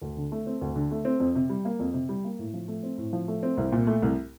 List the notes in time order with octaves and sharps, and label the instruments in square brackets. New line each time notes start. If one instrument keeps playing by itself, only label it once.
[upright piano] D2
D3
A3
C4
D2
D3
A3
C4
F2
C3
G3
A#3
F2
C3
G3
A#3
A2
F3
A3
C4
A2
F3
A3
C4
C2
A#2
A3
C2